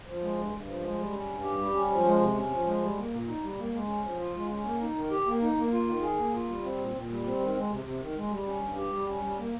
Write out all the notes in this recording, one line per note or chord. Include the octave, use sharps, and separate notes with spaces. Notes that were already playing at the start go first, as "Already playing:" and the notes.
F3
G#3
G2
G2
F3
G#3
G3
C#4
G2
G4
G3
C#4
F3
G#3
C3
C#4
F3
G#3
G3
A#3
A#2
D#4
G3
A#3
G#3
C#4
F3
F4
G#3
C#4
A#3
D#4
D#3
G4
A#3
D#4
A#3
F4
D#3
G#4
A#3
F4
G3
C4
A#2
A#2
G3
C4
D#3
G#3
C3
C3
D#3
G#3
G3
C#4
G2
G4
G3
C#4
G3
A#3